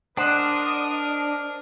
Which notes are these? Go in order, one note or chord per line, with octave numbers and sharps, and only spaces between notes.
D4 A#4 C5 D#5 F#5 D#6